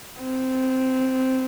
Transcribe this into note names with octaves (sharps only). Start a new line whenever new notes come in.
C4